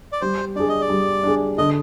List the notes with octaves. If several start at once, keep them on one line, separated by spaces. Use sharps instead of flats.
D5
G3 C5
D4 G#4 D5
D#5
D5
G3
D4 G#4
D3 D#5